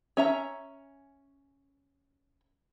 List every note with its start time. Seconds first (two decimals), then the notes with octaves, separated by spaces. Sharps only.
0.17 C#4 E5 A#5